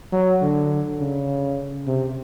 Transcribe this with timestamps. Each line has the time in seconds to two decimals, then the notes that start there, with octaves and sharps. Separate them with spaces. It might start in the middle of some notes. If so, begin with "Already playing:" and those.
0.12 F#3
0.41 D3
1.00 C#3
1.87 C3